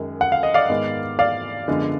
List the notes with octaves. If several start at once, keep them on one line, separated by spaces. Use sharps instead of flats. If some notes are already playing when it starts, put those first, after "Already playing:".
Already playing: F#2 D#3 G#3
F#5
F5
D#5
D5 F5
G#2 D#3 G#3 B3
D5 F5
F#2 D3 F3 G#3 B3